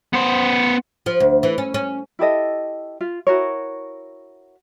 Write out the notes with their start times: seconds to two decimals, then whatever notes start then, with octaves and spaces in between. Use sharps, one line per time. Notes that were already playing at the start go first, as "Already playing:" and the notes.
0.13 B3 C5
1.06 F3
1.20 D2
1.43 E3
1.58 C#4
1.74 C#4
2.19 E4 G4 A4 D#5
3.01 F4
3.27 E4 F#4 A#4 C#5